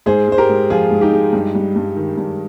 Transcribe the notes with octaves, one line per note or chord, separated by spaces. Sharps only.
G#2 G#4 C5
G#3 C5
G4 A#4
G#2
F3 F4 G#4
G#2
D#4 G4
G#3
G2
G3
G2
D#3
G2